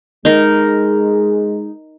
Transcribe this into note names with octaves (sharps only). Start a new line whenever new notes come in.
G#3 D#4 A#4